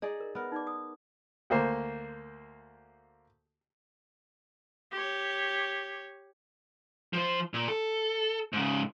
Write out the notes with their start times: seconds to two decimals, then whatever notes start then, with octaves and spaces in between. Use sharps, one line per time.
0.02 D#4 G#4 D5
0.20 A#4
0.35 B3 A#4 B4
0.52 D#4 D5 D6
0.67 D#6
1.50 D2 A#3 C5
4.92 G4 C#5
7.13 F3 C5
7.54 A#2
7.68 A4
8.53 G#2 C#3